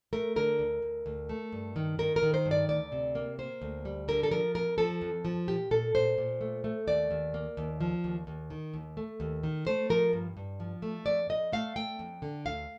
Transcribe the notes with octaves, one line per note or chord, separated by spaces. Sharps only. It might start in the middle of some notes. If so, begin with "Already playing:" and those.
A3 A#4
D3 A#4
D2
D2
D2
A3
G2
D#3
D#3 A#4
A#4
D#3
C5
G2
D5
D2 D5
C3
A#3
A#3 C5
D2
G3
D3 A#4
A4
F3 A#4
F2 A#4
F3 A4
F2
F3
A#2 G4
A#2 A4
A#2 C5
A#2
A3
A3
D#2 D5
D#2
A#3
D#2
F3
D#2
D#2
D#3
D#2
A3
D#2
D#3
A3 C5
F3 A#4
G2
G2
F3
A3
F2 D5
F2 D#5
A3 F5
A3 G5
F2
D3
D2 F5